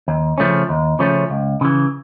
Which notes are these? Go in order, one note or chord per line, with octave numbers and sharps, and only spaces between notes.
D#2
C#3 F3 A3 C#4
D#2
C#3 F3 A3 C#4
C#2
C#3 E3